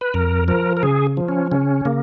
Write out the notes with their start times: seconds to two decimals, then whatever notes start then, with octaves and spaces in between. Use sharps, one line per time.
0.01 B4
0.14 F2 A#4
0.48 F3 A#4
0.77 A#4
0.83 C#3 G#4
1.17 F3
1.29 C#4
1.52 C#3 C#4
1.85 C#3 A#3